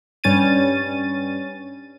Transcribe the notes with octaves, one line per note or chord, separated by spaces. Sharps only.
G2 C#4 A6 D#7